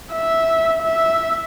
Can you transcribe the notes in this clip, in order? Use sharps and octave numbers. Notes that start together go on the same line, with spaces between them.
E5
E5